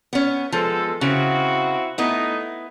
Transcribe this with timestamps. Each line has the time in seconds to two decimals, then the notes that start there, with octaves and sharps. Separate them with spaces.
0.13 B3 C#4
0.52 F3 G#3 B3 A4
1.01 C#3 C4 E4 F#4
1.98 A3 B3 D#4 E4